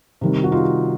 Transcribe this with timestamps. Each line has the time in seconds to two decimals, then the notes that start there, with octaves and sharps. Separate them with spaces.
0.21 C3 D#3 G3
0.44 F#4
0.52 D#4 F4